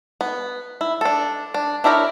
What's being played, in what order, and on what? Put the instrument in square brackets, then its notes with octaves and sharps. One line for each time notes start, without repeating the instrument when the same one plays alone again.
[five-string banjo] B3
E4
D4 A4
D4
D4 E4 G4 A#4 C#5